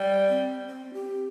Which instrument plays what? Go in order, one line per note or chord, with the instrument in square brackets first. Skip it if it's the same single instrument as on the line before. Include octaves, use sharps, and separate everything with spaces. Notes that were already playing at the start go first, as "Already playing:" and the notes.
Already playing: [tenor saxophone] G3
[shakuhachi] C4
C4
G4